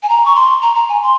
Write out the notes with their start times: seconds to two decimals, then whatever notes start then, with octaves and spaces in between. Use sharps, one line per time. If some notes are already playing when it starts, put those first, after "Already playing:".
0.03 G#5
0.09 A#5
0.25 C#6
0.35 C6
0.62 A#5
0.75 A#5
0.89 G#5
1.03 C6